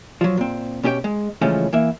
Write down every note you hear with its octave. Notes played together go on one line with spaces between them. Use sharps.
F3 F#3
A#2 C4
B2 C#4 G4 D5 G5
G#3
C#2 E3 F3 G#3 A3 C#4
E3 A#3 E5